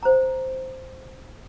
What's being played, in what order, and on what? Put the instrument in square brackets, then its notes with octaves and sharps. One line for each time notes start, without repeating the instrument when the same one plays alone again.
[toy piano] C5 A#5